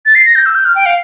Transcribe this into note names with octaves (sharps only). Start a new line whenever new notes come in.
A6
C7
A#6
G6
E6
G6
F6
G5
F5